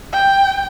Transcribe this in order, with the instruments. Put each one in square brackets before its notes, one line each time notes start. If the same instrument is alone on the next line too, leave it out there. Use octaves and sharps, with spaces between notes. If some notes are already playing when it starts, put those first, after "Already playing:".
[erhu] G5